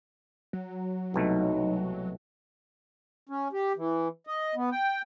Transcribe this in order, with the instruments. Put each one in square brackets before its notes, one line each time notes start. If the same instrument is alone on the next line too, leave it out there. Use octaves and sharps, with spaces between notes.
[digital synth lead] F#3
[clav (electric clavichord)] C2 B2 A3 [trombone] D#4
[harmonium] C#4
G4
E3
D#5
B3
G5